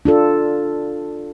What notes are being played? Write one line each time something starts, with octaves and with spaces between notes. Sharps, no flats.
D4 F4 A4